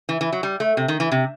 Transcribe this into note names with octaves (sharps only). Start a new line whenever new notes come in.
E3
E3
F#3
G3
A3
C3
D#3
E3
C3